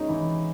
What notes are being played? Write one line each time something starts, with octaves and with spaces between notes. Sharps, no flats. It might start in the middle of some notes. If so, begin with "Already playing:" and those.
Already playing: B2 G#3 B3 C#4 D#4
E3 E4